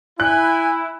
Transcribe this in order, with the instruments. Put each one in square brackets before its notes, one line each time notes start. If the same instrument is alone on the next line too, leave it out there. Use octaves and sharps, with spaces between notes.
[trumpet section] E4 [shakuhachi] G#5 [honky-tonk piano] F#6